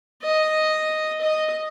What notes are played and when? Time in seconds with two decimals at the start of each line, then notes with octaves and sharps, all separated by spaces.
0.22 D#5
1.21 D#5